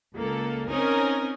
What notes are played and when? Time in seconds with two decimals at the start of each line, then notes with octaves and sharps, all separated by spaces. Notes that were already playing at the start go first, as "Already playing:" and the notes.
0.16 C#2 A#3 A4
0.68 C4 C#4 D#4 A#4 G#5